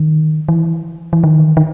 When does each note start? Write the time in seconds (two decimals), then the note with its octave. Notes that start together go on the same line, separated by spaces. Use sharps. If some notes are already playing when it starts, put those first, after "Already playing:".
Already playing: D#3
0.48 E3
1.13 E3
1.24 D#3
1.57 D#3